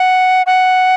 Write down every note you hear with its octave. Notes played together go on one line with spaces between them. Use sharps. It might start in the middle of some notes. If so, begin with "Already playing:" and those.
Already playing: F#5
F#5